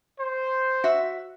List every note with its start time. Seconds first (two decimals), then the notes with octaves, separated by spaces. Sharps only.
0.20 C5
0.84 F#4 E5